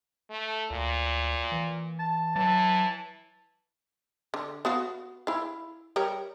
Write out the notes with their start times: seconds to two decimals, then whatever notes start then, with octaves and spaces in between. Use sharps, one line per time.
0.30 A3
0.71 D2 A#2
1.52 E3
1.99 A5
2.36 E3 F#3 A5
4.34 D3
4.65 B3 F#4 F5
5.27 E4 F5
5.96 G3 A#4 C#5